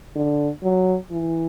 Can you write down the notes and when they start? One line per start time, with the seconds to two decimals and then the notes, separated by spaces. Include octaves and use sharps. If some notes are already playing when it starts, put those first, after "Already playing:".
0.16 D3
0.63 F#3
1.11 E3